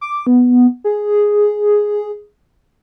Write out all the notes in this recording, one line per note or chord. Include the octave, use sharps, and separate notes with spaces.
D6
B3
G#4